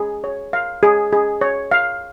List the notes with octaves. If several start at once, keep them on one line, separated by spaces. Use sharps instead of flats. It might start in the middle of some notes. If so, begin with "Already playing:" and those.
Already playing: G#4
C#5
F5
G#4
G#4
C#5
F5